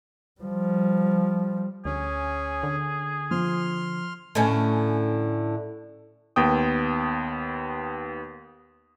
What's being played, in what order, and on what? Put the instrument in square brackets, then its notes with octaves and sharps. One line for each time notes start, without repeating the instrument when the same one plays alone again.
[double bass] F3 G3
[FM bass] D2 [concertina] C#4 [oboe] G#4
[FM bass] D3
[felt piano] F3 [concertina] C6 F6
[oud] A2 D3 C#4
[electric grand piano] D#2 B3 G5 D#6